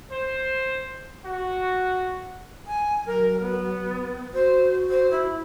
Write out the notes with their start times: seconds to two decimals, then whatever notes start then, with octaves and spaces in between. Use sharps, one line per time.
0.11 C5
1.23 F#4
2.66 G#5
3.06 F#3 A#4
3.40 B3
4.34 F#4 C5
4.89 C5
5.11 E4